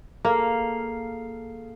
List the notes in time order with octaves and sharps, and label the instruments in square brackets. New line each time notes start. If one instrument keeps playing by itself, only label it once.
[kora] A#3 [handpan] G#4 A4 F5